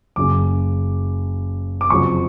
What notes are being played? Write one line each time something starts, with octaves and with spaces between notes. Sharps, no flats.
F#1 F#2 C#3 F#3 D6
D6
F1 F2 C#3 F#3 C#6